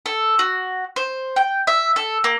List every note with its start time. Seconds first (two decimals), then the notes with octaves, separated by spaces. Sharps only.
0.06 A4
0.39 F#4
0.96 C5
1.36 G5
1.67 E5
1.96 A4
2.24 A#3